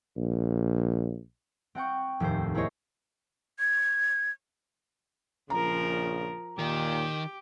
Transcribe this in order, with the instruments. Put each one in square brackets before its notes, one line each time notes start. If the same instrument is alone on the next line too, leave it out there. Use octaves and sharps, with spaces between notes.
[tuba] A#1
[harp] C4 F#5 G5 C#6
F1 D#2 A2 C5
A#3 E4 G#4 C5 C#5 D#5
[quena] G#6
[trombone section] A#1 C#3 [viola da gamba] F3 A#4 [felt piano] A#5
[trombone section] D#2 A#2 [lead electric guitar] D#3 [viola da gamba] G4